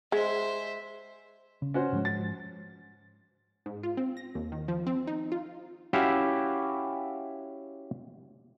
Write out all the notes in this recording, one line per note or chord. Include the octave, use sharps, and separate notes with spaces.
G#3 C5 E5
C#3
C#4 F#4 C5
G#2 F3 G#3
A6
G#2
F4
C4
A#6
D#2
D#3
F3
C4
D#4
F4
C#4 E4 F#4 G4 E5 F5